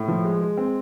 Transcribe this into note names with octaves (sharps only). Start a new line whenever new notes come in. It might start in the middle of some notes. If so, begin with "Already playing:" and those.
Already playing: A2
F3
G#3
G#3
C4